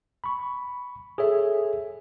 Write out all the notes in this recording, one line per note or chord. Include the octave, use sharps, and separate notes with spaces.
B5 C#6
G#4 A4 C#5 E5